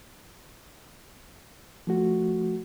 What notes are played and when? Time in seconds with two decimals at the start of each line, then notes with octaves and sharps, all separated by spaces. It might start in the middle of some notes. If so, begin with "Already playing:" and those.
1.87 F3 A3 F#4